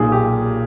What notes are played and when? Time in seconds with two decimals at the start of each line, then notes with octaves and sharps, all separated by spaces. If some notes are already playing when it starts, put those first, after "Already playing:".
Already playing: B1 A#2 G#4
0.12 G4